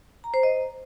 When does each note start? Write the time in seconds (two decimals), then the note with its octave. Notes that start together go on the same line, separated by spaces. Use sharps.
0.24 A#5
0.34 C5
0.43 D#5